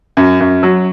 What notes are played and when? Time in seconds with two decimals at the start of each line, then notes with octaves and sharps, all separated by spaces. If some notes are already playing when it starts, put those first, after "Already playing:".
0.17 F#2
0.40 F#2
0.63 F#3